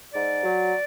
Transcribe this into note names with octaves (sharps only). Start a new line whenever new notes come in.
G#2 D5
F#3